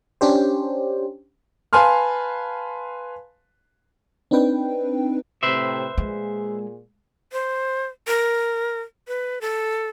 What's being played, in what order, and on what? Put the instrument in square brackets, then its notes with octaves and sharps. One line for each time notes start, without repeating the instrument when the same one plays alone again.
[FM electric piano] C#4 D4 G4 C5
[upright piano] B4 F5 G#5 A5 C6 F6
[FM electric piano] C4 D4 D#4 B4 G5
[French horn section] A2 C3 [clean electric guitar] B4 C5 E5
[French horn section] A#2 G#4 [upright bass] G#3
[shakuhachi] C5
A#4
B4
A4